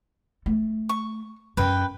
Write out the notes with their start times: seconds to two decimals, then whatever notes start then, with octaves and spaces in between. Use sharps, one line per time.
0.46 A3
0.89 C#6
1.57 F#2 B4 G5